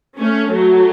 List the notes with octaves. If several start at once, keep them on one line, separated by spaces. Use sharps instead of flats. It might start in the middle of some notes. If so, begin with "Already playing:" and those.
A3 C#4
F#3 A3